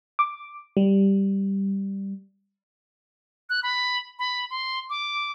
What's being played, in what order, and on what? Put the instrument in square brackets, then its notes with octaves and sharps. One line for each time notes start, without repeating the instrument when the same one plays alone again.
[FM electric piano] D6
G3
[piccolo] F#6
B5
B5
C6
D6